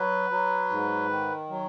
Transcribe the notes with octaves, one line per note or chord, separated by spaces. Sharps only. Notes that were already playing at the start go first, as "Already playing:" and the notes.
Already playing: F#3 B4
F#3
G#2
D#3
F#3